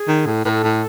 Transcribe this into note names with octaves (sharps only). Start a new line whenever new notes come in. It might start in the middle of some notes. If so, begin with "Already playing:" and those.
Already playing: G#4
D#3
A2
A2 A4 B4
A2